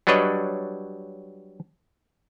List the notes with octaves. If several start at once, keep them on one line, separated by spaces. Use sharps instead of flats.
F#3 G3 D4 B4 C#5 D#5